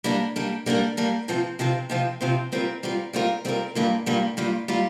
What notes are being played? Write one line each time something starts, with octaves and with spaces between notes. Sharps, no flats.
G3 A#3 D4 A#4
G3 A#3 D4 A#4
G3 A#3 D4 A#4
G3 A#3 D4 A#4
C3 F3 C4 F4 C5
C3 F3 C4 F4 C5
C3 F3 C4 F4 C5
C3 F3 C4 F4 C5
G3 C4 F4 A#4
G3 C4 F4 A#4
G3 C4 F4 A#4
G3 C4 F4 A#4
G2 G3 A#3 F4
G2 G3 A#3 F4
G2 G3 A#3 F4
G3 A#3 F4